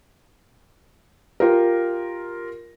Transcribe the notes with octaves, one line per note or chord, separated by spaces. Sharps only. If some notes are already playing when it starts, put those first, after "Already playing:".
F4 G4 A#4